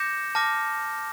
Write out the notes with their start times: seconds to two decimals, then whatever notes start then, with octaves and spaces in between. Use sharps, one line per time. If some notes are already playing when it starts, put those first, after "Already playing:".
Already playing: D6 G6 A#6 C#7 E7
0.35 A5 D6 F6 A#6